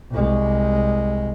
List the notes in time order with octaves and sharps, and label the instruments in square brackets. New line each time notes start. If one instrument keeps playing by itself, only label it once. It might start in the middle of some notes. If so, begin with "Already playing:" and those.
[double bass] C2 G#3